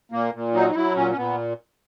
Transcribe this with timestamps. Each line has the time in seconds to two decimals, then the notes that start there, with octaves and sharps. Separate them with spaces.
0.12 A#2 A#3
0.34 A#2
0.54 F#3 D#4
0.70 D#4
0.75 F#3 E4
0.96 A#2 C#4
1.11 C#4
1.17 A#2 B3